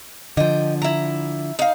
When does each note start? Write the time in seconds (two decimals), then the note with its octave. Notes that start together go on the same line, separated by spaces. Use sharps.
0.37 D3 F3 D#5 G5
0.82 E4 A#5
1.59 D#4 F5